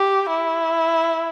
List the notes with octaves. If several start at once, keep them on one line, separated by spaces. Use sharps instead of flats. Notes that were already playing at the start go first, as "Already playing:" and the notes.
Already playing: G4
E4